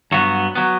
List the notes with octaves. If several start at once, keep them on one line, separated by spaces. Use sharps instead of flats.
G2 F#3 B3 F#4
F#3 B3